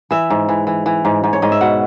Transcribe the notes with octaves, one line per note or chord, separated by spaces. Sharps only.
E3 E5
G#2
E3
E3
E3
G#2
G#2
C#5
G#2 D#5
E5
B2 F#5